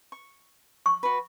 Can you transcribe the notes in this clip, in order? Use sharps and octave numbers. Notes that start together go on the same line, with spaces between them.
C#6
C#6
F#4 B4